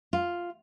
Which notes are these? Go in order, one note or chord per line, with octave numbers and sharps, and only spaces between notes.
F4